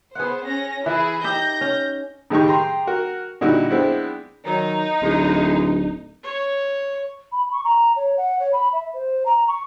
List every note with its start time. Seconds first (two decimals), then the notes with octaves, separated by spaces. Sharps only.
0.15 B3 G#4 C5 F#5
0.44 C#4 A#6
0.86 E3 E4 G#4
1.24 D#4 G4 E5 G6 A#6
1.61 C#4
2.30 A2 D#3 G#3 D#4 G4 C#6
2.46 G4 G#4 G5 A#5 C6
2.87 F#4 A#4
3.41 A#2 D3 G3 D#4 E4 F#4
3.70 G#3 B3 C4 D4 E4
4.45 D#3 F#3 D#4
5.02 D1 A2 G#3
6.23 C#5
7.32 B5
7.52 C#6
7.64 A#5
7.96 C#5
8.17 F#5
8.39 C#5
8.53 B5
8.73 E5
8.93 C5
9.26 A#5
9.48 C#6